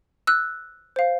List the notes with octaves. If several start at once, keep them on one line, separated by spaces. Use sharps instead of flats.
E6 F#6
C5 F5